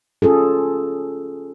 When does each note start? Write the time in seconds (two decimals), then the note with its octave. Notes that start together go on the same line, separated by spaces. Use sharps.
0.22 C#4 F4 G#4 A4